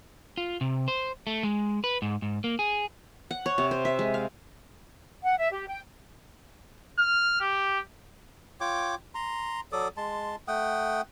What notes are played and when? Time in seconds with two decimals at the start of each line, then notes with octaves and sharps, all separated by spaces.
0.38 F4
0.61 C3
0.88 C5
1.27 A3
1.43 G#3
1.84 B4
2.02 G#2
2.22 G#2
2.44 A#3
2.59 G#4
3.31 F#5
3.46 C#5
3.58 C3
3.71 C5
3.85 E5
3.99 G#3
4.14 F5
5.23 F#5
5.38 E5
5.52 G4
5.68 G5
6.99 F6
7.41 G4
8.61 F4 C#5 G5 D6
9.15 A#5 C6
9.72 F#3 A4 D5 D#6
9.97 G#3 A5 C6
10.48 A3 F#5 G5 D#6